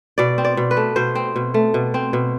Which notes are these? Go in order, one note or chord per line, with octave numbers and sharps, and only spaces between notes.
B2 D5
C4
D5
B2
B4
A3
B2 C5
C4
B2
A3
B2
C4
B2